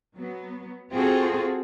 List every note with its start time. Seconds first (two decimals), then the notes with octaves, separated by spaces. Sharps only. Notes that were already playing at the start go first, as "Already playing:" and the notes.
0.15 F#3 B3
0.92 C4 F4 F#4 G#4 A4